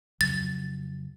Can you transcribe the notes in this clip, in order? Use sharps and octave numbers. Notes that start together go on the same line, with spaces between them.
F2 C#3 F#3 A6